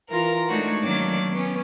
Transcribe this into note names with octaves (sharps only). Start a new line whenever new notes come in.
E3 F4 A#4 A#6
G#3 A3 D4 D#4 F#4 C#5
D#3 F#3 A#3 C#4 D4 D5
B3 C#4